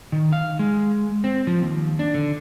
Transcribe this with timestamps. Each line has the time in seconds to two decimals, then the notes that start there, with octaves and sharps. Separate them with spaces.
0.12 D#3
0.32 F5
0.59 G#3
1.24 C4
1.47 F3
1.62 D#2
1.99 D4
2.14 D3